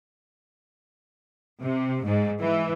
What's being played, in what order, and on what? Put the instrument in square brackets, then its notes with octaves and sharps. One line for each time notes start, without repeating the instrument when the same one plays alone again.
[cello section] C3
G#2
E3